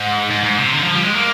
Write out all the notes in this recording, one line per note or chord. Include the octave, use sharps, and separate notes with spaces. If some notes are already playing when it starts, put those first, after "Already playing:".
Already playing: G#2
G#2
G#2
C3
D3
F3
G3
G#3
A#3